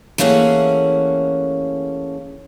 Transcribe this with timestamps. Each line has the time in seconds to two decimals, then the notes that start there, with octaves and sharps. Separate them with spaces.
0.18 E3 A3 A#3 C#4 G#4 F#5